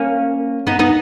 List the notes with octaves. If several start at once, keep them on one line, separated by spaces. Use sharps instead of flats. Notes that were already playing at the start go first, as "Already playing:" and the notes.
Already playing: A#3 C#4
B3 D#4
B3 D#4